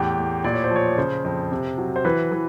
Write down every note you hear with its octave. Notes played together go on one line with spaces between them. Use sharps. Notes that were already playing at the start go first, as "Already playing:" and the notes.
Already playing: E2 A2 G4
A2
A#2 D5
C#5
C5
F3
C#5
C#3 C5
F2
C3
F#3
C5
E3 B4
E3